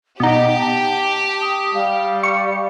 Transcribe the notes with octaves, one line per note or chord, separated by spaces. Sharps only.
B2 D#4 G4 F#5
A5
D#6
G3 F5
C#6